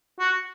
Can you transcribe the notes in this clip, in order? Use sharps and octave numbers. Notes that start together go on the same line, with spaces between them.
F#4